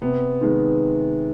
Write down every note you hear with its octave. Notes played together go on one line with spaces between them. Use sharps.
C3 B3
D#3 G#3 B3